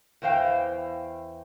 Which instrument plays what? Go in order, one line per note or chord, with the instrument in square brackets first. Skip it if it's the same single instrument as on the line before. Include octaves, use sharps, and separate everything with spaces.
[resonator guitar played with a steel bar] E2 E3 C5 F5 G5